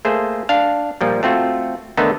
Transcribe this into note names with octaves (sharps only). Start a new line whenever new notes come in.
A3 A#3 G#4 C5
D4 F5
A#2 F3 G3
A3 C4 F4 F#4
D3 D#3 A3 B3 D#4